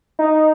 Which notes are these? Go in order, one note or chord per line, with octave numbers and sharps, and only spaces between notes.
D#4